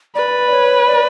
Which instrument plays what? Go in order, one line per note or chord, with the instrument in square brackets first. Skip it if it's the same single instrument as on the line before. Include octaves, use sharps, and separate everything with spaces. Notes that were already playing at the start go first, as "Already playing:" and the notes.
[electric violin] B4 [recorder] D5
[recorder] C#5
D5